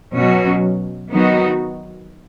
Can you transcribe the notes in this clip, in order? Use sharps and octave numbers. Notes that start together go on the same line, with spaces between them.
B2 F#3 C#4 F#4
D#3 F#3 B3 D#4 F#4